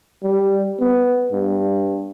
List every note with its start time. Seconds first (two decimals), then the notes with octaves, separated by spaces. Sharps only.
0.23 G3
0.80 B3
1.32 G2